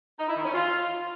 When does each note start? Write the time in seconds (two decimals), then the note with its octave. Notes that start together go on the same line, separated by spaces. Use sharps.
0.19 D#4
0.28 E4
0.36 D#3
0.45 C#4
0.54 F4